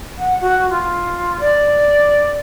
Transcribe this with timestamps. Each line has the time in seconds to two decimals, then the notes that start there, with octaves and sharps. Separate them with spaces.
0.18 F#5
0.41 F#4
0.70 F4
1.40 D5